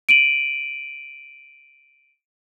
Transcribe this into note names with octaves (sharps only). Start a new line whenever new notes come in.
D7 D#7 F#7